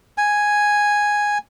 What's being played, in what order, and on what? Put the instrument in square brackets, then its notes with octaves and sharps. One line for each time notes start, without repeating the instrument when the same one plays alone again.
[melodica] G#5